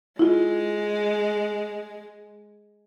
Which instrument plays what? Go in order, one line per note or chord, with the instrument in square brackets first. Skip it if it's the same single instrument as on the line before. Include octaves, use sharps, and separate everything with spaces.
[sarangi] G#3 [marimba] E4 F4